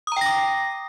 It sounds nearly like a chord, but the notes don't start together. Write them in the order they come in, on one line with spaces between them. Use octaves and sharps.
D#6 A#5 G5 A#6 D6